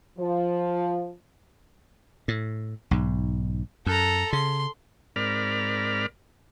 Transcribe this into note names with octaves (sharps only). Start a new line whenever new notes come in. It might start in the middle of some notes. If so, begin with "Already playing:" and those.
F3
A2
B1 G#2
F#2 A4 A#5
C#3 C6
G#2 C4 A#4 D5 B5 F6